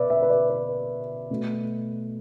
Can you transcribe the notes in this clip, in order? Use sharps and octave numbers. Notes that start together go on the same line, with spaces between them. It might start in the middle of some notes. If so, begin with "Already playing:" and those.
Already playing: B2 B3 B4 D5 E5
E5
B4
D5
B4
B2 A3